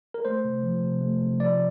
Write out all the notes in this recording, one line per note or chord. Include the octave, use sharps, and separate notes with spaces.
A#4
A3 C5
C3
F3
C3
A3
C3
F3 D5